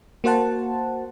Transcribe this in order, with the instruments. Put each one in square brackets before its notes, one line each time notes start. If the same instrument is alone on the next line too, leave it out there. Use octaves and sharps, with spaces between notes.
[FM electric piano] A#3 F#4 C5 F#5 A5